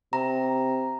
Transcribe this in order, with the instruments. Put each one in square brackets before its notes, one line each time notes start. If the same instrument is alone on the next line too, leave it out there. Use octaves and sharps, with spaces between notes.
[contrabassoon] C3 [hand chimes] A#5